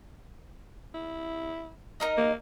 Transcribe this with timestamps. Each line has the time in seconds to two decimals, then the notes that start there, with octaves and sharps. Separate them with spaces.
0.94 E4
2.00 D#4 A#4 D#5
2.18 A#3